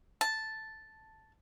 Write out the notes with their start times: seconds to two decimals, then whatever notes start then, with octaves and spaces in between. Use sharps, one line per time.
0.21 A5